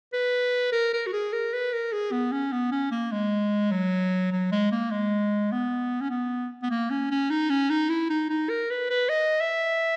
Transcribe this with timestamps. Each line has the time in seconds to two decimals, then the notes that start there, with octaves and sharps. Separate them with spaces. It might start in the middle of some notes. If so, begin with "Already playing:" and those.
0.13 B4
0.72 A#4
0.93 A#4
1.06 F#4
1.13 G#4
1.33 A#4
1.53 B4
1.73 A#4
1.93 G#4
2.12 B3
2.32 C#4
2.52 B3
2.71 C#4
2.91 A#3
3.12 G#3
3.71 F#3
4.32 F#3
4.52 G#3
4.72 A#3
4.91 G#3
5.52 B3
6.01 C#4
6.10 B3
6.63 B3
6.71 A#3
6.90 C#4
7.11 C#4
7.30 D#4
7.50 C#4
7.70 D#4
7.90 E4
8.10 D#4
8.29 D#4
8.49 A#4
8.70 B4
8.90 B4
9.09 D#5
9.40 E5